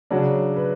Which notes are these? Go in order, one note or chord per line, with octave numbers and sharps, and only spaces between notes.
C#3 F#3 D4
B4